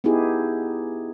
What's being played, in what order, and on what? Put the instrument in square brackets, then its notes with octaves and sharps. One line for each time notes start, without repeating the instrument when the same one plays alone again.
[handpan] B3 D#4 E4 G4 G#4